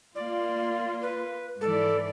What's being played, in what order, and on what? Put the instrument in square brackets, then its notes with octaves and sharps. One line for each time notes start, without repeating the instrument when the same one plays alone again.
[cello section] A#3 F4 [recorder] D5
[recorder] B4
[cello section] G#2 E3 D5 [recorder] A4